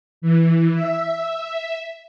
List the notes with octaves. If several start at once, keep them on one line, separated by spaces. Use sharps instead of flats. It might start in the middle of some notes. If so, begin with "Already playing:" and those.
E3
E5